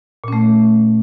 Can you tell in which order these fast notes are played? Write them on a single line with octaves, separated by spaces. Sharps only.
A#2 C#4 A3